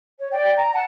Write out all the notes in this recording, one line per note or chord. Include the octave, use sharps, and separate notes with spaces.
C#5
D5 G5
A#5
F#5 A5